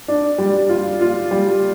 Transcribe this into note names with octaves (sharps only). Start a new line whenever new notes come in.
D4
G3
F4
F4
G3